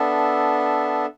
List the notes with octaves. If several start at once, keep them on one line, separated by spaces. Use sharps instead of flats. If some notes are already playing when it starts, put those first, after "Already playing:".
Already playing: B3 D4 A4 E5